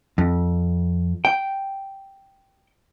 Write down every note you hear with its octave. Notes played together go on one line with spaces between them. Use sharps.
F2
G5